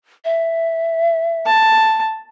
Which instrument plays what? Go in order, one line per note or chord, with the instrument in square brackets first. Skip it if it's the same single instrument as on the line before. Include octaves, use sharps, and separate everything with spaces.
[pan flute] E5
[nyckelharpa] A5